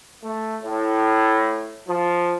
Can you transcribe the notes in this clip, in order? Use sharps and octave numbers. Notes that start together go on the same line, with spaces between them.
A3
A2
F3